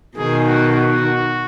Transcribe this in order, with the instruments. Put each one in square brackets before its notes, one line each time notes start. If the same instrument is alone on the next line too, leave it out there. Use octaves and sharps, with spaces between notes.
[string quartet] B2 D#3 [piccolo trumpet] G#4
[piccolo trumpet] F#4
F#4